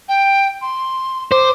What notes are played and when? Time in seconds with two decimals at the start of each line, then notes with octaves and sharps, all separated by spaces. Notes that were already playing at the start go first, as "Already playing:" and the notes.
0.09 G5
0.62 C6
1.32 C5 D6